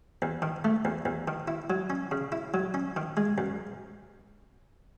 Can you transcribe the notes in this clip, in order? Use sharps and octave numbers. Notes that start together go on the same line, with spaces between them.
E2
D#3
A3
E2
E2
D#3
E4
F#3
C#4
C#3
E4
F#3
C#4
D#3
G#3
F#2